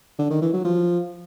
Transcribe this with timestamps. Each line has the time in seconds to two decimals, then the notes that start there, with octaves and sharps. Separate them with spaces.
0.19 D3
0.30 D#3
0.42 E3
0.53 F#3
0.65 F3